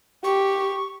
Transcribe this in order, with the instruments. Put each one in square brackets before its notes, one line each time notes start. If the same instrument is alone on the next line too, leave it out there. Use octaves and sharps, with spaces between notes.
[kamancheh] G4 [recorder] C#6